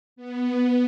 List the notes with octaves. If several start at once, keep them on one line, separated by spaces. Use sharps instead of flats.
B3